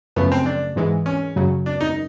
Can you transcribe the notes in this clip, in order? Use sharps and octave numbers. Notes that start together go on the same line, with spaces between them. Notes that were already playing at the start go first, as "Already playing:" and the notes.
F#2 C#3 F3 A3 B3
C4
D4
G#2 E3 G#3
C#4
F#2 C#3 F#3
D4
D#4